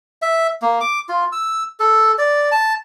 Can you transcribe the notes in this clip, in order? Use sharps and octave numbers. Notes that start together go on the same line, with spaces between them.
E5
A#3
D6
F4
E6
A4
D5
A5